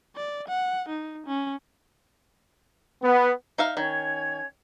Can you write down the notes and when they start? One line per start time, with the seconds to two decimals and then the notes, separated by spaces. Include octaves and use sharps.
0.16 D5
0.48 F#5
0.89 D#4
1.27 C#4
3.03 B3
3.58 D#4 E5 F5
3.77 D#3 C#4 C#5 G#6